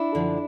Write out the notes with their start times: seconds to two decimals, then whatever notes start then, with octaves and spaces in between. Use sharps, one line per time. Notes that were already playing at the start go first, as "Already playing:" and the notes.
Already playing: D4 E4
0.15 F#2 D3 F3